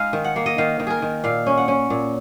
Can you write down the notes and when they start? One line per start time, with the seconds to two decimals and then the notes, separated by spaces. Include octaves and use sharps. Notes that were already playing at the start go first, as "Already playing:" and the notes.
Already playing: G#3 D#4 D#5 F5
0.13 D#3
0.24 F#5
0.36 A#3
0.46 D#5
0.58 D#3 F5
0.80 D#3
0.87 G#4 A#4
1.02 D#3
1.24 A#2 F5
1.46 C#4
1.57 F#5
1.68 C#4
1.90 A#2